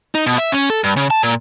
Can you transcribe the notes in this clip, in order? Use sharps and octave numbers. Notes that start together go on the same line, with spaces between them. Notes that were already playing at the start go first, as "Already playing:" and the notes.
D#4
B2
E5
C#4
A4
G2
C#3
A5
A#2